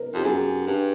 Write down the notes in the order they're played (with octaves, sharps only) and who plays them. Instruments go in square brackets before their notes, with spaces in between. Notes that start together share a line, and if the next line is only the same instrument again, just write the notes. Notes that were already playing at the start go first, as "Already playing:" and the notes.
Already playing: [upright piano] A#4 B4
[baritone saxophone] F2 [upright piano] G4
[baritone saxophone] F#2 [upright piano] G#4
[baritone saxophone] G2